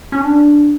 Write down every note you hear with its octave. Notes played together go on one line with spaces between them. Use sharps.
C#4
D4